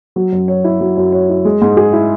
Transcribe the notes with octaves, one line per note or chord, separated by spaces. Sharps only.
F#3
F#2
C#5
E4
F#3
F#2
C#5
E4
G#3
G#2
G#4
E4